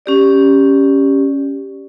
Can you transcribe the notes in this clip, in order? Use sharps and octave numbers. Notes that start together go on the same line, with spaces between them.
C#4 G4 D5